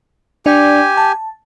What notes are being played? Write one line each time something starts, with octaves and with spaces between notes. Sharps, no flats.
D4 G4 D5 G#5
A5